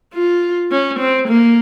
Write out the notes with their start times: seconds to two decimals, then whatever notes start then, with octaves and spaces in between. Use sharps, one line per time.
0.14 F4
0.71 C#4
0.99 C4
1.28 A#3